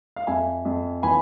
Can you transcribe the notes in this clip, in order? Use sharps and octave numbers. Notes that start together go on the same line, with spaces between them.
F5
F2 E5 G#5
F2
E3 G#5 B5